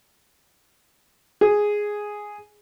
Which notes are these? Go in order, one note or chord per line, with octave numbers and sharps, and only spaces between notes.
G#4